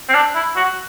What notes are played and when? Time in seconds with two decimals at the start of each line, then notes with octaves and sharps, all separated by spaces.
0.09 C4
0.15 D4
0.36 E4
0.57 F#4